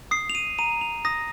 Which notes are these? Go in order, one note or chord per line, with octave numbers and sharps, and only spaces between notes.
D#6 C7
F7
D#7
A#5 D#7
F7
D#6 A#6